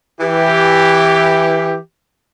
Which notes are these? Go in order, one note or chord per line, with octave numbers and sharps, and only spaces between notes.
E3 G4